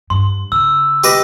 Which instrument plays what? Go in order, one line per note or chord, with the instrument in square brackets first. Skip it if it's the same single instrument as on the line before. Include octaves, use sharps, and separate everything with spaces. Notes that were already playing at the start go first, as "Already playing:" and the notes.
[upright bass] G2 [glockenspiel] C6
[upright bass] C#3 [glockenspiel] E6
[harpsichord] G4 B4 D#5